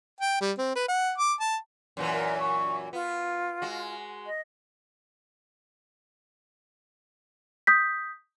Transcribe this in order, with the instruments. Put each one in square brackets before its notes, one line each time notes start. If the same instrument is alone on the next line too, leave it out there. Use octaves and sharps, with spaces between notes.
[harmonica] G5
G3
C4
B4
F#5
D6
A5
[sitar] F#2 A#2 E3
[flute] A#4
C#6
[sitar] B3 [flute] F4
[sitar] G#3 F#4
[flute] D#5
[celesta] D#6 G6 B6